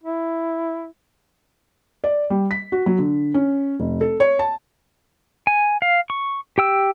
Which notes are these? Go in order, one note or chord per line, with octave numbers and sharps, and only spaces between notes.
E4
D5
G3
B6
F#4
F#3
D3
C#4
F1
A4
C#5
A5
G#5
F5
C#6
G4 G5 E6